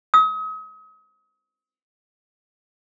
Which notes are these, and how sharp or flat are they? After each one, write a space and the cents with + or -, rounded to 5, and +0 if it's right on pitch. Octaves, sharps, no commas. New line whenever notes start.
D#6 +40